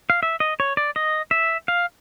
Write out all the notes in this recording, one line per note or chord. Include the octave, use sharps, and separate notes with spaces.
F5
E5
D#5
C#5
D5
D#5
E5
F5